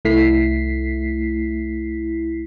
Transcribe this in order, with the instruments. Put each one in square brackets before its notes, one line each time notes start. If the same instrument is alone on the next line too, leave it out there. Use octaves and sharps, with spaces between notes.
[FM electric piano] C2 A3 E4 B6 C7